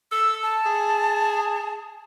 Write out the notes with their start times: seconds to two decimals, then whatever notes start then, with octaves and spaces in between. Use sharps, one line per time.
0.12 A4 E6
0.43 A5
0.66 G#4